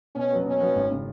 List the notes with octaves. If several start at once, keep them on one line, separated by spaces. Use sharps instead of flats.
B2 C#4
F#3 B3 F#4
B2 C#4
F#3 B3 F#4
G#1
C#3